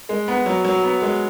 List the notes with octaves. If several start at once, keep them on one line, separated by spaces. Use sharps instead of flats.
G#3
B3
F#3
F#3
B3
G#3